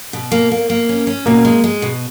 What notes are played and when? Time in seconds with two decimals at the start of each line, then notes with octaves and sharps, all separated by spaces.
0.13 B2
0.32 A#3
0.52 A#3
0.70 A#3
0.89 C#4
1.07 C#4
1.26 B2 A#3
1.45 G#3
1.64 G#3
1.82 B2